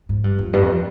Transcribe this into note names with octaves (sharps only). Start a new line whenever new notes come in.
G#2
G2
F2
G2
F2